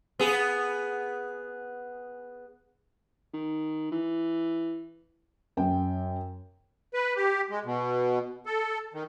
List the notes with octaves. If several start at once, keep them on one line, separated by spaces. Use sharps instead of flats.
B3 G#4
D#3
E3
F#2 G5
B4
G4
G#3
B2
A4
D#3